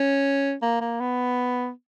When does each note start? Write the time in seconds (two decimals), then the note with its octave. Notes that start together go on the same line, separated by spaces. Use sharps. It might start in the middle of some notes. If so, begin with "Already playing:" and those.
Already playing: C#4
0.62 A#3
0.81 A#3
1.00 B3